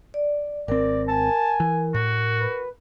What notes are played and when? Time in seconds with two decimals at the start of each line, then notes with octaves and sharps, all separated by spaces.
0.14 D5
0.68 G#1 C4 A#4 D5
1.09 G#5 A5
1.60 E3
1.94 A2 F#4
2.40 B4